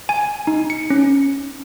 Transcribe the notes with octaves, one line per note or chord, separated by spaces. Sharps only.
G#5
D#4
C#7
C#4